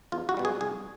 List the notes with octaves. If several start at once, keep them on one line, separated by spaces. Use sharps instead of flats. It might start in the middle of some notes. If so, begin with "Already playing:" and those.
E2 F4
F#4
B2 G3
G#4
C2 G#4